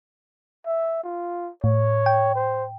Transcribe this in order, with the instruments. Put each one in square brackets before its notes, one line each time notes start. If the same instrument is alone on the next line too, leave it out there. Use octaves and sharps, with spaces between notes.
[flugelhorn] E5
F4
[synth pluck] A2 [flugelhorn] C#5
[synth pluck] G5
[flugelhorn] C5